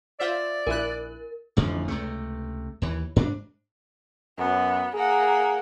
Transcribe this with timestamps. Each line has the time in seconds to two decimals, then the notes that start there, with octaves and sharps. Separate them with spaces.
0.19 F4 C5 D5 E5
0.67 A#1 E4 A#4 F#6
1.57 A1 F2 D3 F3
1.88 C#2 C3 A3
2.82 D#2 E3
3.16 G#2 D4
4.38 F#2 B3
4.95 A#3 G#4 F#5